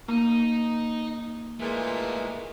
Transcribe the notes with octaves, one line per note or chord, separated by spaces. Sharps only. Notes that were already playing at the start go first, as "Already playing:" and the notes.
A#3 D#4
A#2 E3 G#3 A3 F4